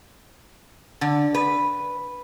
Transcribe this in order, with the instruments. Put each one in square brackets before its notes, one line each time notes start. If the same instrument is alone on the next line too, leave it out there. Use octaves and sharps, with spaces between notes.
[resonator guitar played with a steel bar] D3
B4